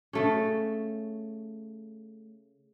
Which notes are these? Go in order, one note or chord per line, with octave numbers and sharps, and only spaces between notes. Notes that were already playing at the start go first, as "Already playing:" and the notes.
C#3 A3 C#4